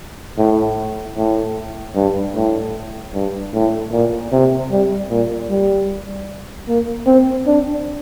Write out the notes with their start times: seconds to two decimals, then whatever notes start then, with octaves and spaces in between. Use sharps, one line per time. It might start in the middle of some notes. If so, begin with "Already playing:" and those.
0.38 A2
1.17 A2
1.95 G2
2.35 A2
3.14 G2
3.53 A2
3.92 A#2
4.32 C3
4.71 G3
5.10 A#2
5.50 G3
6.68 A#3
7.07 C4
7.46 D4